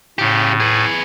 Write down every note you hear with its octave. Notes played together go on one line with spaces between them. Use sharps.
A2 C#3 G4
G#4 B4